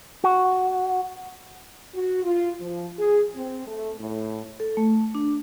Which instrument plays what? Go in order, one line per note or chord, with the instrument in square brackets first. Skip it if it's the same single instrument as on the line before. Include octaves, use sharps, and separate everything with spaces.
[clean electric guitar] F#4
[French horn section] F#4
F4
F3
G#4
C4
A3
A2
[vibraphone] A4
A3
D4